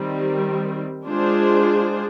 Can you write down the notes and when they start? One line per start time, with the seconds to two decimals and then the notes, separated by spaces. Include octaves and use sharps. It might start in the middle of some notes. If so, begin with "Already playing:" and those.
Already playing: D#3 G3 C4
1.05 G#3 D4 F4 G#4 C5